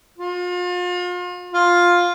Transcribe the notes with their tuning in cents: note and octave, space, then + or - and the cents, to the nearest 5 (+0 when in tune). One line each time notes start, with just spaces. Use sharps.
F4 +35
F4 +5